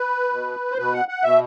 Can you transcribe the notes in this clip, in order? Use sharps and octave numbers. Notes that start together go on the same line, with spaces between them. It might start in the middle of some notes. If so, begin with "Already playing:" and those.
Already playing: B4
B2
C5
B2 B4
F#5
F#5
B2 E5